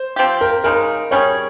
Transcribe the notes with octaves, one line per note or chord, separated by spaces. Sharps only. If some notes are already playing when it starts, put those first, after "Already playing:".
Already playing: C5
F3 C4 G4
A#4
C#3 G#3 D#4 A#4
G3 C#4 F4 G#4 C#5